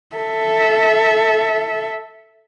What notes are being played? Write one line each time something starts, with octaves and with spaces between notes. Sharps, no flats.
A4 E5